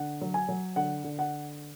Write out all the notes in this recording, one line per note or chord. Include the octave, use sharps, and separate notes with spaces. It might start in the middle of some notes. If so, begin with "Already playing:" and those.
Already playing: D3 F#5
F#3
G#5
F#3
D3 F#5
D3
F#5